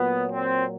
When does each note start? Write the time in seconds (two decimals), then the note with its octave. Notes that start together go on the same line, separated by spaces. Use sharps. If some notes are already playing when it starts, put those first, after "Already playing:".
Already playing: A#2 F#3 B3
0.30 C4